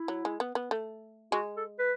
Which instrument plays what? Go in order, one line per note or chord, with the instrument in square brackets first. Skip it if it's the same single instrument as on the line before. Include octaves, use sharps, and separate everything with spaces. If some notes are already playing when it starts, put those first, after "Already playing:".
Already playing: [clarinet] E4
[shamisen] F#3
G#3
B3
B3
A3
[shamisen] G#3 [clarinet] F#4
[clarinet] A4
B4